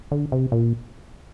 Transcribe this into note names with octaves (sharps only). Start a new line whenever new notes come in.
D3
C3
A#2